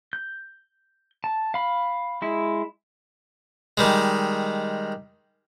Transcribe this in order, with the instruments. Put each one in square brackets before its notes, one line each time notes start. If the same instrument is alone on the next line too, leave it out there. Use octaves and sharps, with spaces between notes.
[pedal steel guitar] G6
A5
F5 B5
G#3 E4
[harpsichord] D#3 G3 G#3